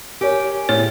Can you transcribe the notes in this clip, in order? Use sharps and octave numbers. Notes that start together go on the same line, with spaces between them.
G4 A#4 C#5 G#5
A2 G#4 C#5